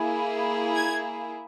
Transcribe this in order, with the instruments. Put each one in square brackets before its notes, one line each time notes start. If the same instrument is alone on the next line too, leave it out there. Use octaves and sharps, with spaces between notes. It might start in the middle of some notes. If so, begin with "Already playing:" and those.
Already playing: [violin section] A#3 E4 G#4
G#6